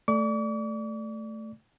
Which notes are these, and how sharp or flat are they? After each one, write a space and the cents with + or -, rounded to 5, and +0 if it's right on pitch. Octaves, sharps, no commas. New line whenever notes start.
A3 +0 D5 +0 D6 -45